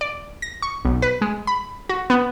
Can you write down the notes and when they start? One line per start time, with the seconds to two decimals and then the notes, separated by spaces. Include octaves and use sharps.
0.01 D5
0.42 A#6
0.62 C#6
0.85 B1
1.02 B4
1.22 G#3
1.47 B5
1.89 F#4
2.10 B3